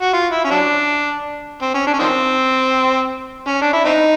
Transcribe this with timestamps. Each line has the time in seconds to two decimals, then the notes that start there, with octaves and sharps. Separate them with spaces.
0.02 F#4
0.13 F4
0.31 E4
0.45 C#4
0.51 F#3 D4
1.62 C4
1.75 C#4
1.87 D4
1.94 C#4
1.99 D#3 F3 C4
3.48 C#4
3.61 D4
3.73 E4
3.85 C4 D#4